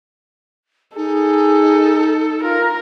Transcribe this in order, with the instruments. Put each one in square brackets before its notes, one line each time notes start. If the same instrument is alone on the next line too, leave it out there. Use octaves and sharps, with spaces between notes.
[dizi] D#4 [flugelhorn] G#4 [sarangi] A4
[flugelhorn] F4 [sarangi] A#4